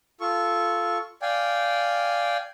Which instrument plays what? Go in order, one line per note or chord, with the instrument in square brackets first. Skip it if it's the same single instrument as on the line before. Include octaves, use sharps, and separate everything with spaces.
[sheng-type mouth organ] F4 A4 C#6
D5 F5 G5 G#5